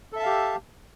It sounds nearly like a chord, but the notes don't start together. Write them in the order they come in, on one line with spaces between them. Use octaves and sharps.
A4 E5 A5 F5 G4